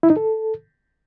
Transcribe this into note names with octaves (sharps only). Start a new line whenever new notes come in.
E4
D#4
A4